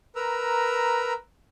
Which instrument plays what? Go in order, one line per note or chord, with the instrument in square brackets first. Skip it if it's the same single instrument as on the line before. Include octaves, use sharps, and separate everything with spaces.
[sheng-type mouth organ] A#4 B4 A#5 E6